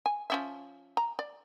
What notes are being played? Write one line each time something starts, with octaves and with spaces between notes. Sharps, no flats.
G#5
F3 C#4 E5
A#5
D5